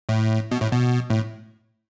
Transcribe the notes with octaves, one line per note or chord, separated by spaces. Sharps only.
A2
B2
A2
B2
A2